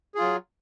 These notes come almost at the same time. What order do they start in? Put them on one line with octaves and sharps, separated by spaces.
G#4 F4 F#3